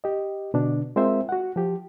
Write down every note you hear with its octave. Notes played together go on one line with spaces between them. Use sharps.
G4 D#5
B2 D3 D4
G#3 C4 F4 A#4 C5 E5
F#4 F#5
F3 G4